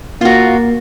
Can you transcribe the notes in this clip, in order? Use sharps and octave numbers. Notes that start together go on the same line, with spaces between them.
A#3 F4 F#4